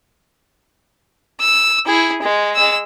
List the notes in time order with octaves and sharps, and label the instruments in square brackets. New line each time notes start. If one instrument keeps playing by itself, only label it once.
[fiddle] E6
E4 G#4
G#3
G#3 E6